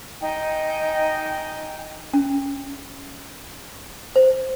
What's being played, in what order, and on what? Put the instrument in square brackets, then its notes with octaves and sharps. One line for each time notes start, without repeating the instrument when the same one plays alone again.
[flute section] D#4 G5 G#5
[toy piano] C#4
C5